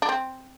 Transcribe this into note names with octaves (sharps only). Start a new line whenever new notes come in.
D4
C4